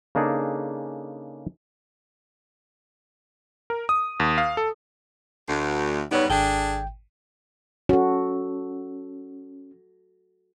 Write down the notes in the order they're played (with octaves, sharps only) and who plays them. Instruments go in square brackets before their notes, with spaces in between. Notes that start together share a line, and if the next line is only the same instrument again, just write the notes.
[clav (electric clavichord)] C#3 A#3 D4 D#4 G#4 A4
[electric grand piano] A#4
D#6
D#2
F5
A4
[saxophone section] D2
[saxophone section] G#2 G3 B3 [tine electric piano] D#4 C#5
[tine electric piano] G#1 G5 [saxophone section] D4 G#4 A4
[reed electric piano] C#4 [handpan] F#4 A4